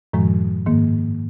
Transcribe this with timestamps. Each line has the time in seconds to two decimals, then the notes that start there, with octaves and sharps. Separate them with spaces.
0.13 F#2 A2 D#3 F3 G#3
0.66 G#2 D#3 A#3